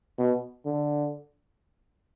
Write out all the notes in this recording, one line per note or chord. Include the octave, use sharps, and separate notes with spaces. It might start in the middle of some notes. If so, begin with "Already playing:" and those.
B2
D3